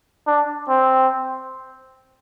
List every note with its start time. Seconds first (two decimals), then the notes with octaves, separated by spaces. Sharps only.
0.27 D4
0.69 C4